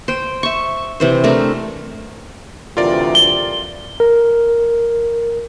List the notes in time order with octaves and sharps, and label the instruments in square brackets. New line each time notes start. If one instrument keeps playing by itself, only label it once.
[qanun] C5 G5
E5 C#6
C3 E3 C5
A3 C4 D4 A#4
[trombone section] D2 C3 E3 [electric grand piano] F4 A#4 D5
[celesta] G7
[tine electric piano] A#4